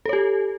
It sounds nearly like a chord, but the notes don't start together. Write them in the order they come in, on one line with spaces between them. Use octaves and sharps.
A4 C#5 G4